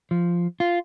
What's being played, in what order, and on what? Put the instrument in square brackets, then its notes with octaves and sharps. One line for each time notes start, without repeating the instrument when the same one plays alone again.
[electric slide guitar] F3
F4